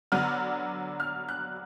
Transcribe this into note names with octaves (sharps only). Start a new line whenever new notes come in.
D3 F#3 B3 D4 F6
F6
F#6